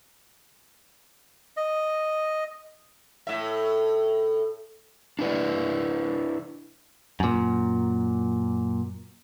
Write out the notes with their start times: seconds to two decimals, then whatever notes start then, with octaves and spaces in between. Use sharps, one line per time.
1.57 D#5
3.27 A2 E5
5.19 D4 E4 B4 D5
7.20 F#2 A#2